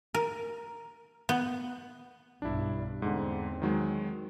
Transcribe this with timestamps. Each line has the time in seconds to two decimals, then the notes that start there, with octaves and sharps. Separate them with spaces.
0.14 A#4
1.29 B3
2.42 B1 G2 D4 E4
3.02 E2 G#2 D3 C4
3.62 D#3 F#3 G#3